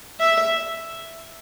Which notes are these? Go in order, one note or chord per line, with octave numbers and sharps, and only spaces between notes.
E5